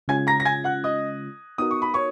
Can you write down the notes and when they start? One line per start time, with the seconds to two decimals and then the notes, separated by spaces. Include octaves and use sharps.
0.08 C#3 G#3 C#4 F4 G#5 G#6
0.27 A#5 A#6
0.40 A#6
0.45 G#5 G#6
0.64 F#5 F#6
0.84 D#5 D#6
1.58 B3 D#4 F#4 A#4 D#6
1.71 C#6
1.82 B5
1.94 C#5 C#6